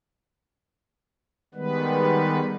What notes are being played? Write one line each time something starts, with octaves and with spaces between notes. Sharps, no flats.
D#3 G3 G#3 B3 B4